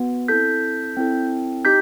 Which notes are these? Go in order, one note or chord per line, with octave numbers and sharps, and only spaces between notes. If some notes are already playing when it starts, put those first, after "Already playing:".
Already playing: B3 F#4
C4 E4 A4 G6 B6
C4 E4 A4
D#4 G4 G6 B6